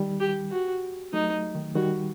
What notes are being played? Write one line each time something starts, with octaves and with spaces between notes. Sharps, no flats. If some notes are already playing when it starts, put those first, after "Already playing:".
Already playing: D#3 G3
G4
F#4
F#3 A3 D#4
D#3
D#3 G3 F#4